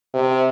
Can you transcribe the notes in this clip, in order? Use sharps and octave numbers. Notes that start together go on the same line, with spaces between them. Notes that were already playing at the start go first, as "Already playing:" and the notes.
C3